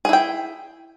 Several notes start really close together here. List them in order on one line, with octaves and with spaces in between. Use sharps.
G#4 E4 G5